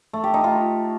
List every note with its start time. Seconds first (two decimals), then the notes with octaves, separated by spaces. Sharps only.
0.13 A3
0.24 G4
0.34 D#4
0.44 F4